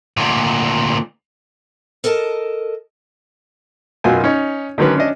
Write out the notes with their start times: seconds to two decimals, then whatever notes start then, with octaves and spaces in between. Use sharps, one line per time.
0.17 D2 A#2
2.04 A4 A#4 D#5 G#5 A5
4.04 B1 F#2 B2 F4 A#4 G#5
4.24 C#4 D#4 C#5
4.78 D3 D#3 F#3 C#4 B4
4.96 C#4 D4 D#5